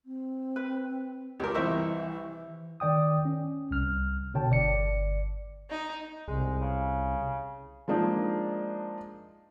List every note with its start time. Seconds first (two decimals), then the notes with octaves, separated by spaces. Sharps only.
0.05 C4
0.56 B4
1.40 C#2 G4 A#4
1.54 C2 E3 E4 C5 D#5 E5 C#6
2.80 D#3 D5 G5 D#6
3.25 C#4
3.71 C2 F6
4.34 B2 D3 C#5 G5 A5
4.50 G1 D5 C#7
5.70 D#4
6.28 C2 G#3
6.62 C#3
7.88 F3 G#3 A#3 D4 D#4